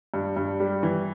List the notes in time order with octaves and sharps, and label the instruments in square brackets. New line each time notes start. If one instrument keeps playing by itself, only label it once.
[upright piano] G2
G2
G3
E3